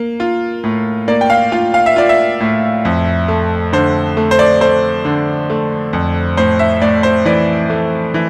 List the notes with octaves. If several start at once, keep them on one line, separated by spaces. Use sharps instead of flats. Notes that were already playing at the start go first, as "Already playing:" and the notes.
Already playing: A#3
F4
A2
A#3 D5
G5
F5
F4 F5
F5
E5
F4 D5
E5
A2
F2
A3
D3 C5
A3
C5
D5
A3 C5
D3
A3
F2
A2 C5
E5
A2 D5
C5
E3 D5
A3
E3